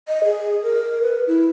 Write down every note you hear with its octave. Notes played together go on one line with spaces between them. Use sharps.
D#5
G#4
A#4
B4
E4